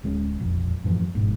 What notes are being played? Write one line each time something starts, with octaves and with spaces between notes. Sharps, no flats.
D1 G#3 B3 C#4
E1 A#1 F2
F#2 A2 E3 F3
G1 G#2 B2